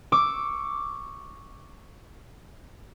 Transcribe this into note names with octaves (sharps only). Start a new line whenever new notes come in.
C#6 D6 E6